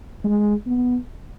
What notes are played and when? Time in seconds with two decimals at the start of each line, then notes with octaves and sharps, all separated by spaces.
0.24 G#3
0.66 B3